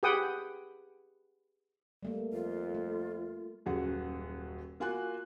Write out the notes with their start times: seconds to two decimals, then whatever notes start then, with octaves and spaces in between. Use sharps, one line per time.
0.03 G4 G#4 B4 F#5 G5 D#6
2.03 G3 A3 A#3
2.33 F2 F4
2.74 A3
3.66 D#1 F#2 F#4 G#4 F#5
4.80 A#3 F4 F#4 G#5 C6 F#6